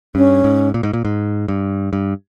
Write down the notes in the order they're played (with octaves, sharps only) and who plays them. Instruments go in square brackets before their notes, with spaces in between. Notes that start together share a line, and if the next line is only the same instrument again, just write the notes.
[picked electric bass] G2 [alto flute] C#4
[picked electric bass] G#2
A#2
G#2
A#2
G#2
G2
G2